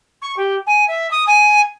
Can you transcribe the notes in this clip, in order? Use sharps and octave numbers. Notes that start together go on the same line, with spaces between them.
C#6
G4
G#5
E5
D#6
G#5